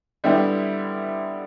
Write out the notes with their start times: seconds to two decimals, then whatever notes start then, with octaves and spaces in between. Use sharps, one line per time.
0.24 D3 G3 B3 E4 G4